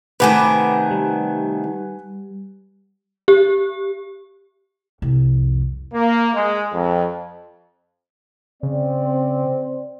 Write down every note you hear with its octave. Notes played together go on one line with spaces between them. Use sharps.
C3 D#3 A3 B4 F#5 G#5 B5 D6
G3
G4
C2 F2
A#3
G#3
F2
C#3 C4 D5